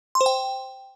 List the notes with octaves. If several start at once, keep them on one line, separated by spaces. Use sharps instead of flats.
C6
C5
G5